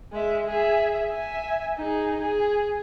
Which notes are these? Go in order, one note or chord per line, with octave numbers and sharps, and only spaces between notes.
G#3 E5
G#4 E5
E5 G#5
D#4 G#4
G#4